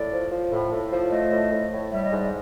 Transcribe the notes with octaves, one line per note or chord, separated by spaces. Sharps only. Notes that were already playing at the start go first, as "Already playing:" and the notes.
Already playing: A2 D5
F3
F3
A2
A2
F3
A3 D#5
A2
A2
A2
G3 E5
D#5
G#2 D5